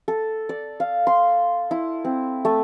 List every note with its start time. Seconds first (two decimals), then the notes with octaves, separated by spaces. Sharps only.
0.08 A4
0.49 D5
0.80 F5
1.07 C6
1.71 E4
2.05 C4
2.45 A3